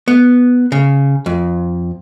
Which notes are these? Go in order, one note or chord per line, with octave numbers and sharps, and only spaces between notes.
B3
C#3
F2